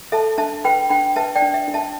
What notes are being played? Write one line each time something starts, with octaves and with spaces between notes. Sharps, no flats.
A4 E5 A5
D4 E5 A5
B4 G5 B5
D4 G5 B5
B4 E5 A5
D5 G5
D4
E5
D4
E5 A5